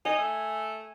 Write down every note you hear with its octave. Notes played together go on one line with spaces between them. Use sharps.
D#4 G#5
A3